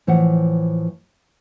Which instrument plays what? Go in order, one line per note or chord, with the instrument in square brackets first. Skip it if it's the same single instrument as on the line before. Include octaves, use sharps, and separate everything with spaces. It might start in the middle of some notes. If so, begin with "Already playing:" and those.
[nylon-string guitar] A2 E3 F3 C5 F#5